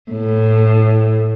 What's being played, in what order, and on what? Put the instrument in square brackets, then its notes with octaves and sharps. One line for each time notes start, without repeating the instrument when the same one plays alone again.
[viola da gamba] A2